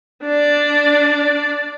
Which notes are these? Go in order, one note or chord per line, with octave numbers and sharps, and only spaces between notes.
D4 D5